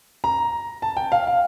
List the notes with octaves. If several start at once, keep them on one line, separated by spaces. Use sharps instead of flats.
A#5
A5
G5
F5
F5